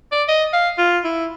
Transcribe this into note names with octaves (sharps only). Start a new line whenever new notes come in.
D5
D#5
F5
F4
E4